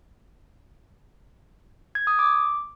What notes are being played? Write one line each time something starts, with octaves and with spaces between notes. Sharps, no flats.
G#6
D#6
D6